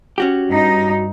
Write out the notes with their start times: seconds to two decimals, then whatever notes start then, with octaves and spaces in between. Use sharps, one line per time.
0.18 C#4 F#4 G4
0.48 G2 D#4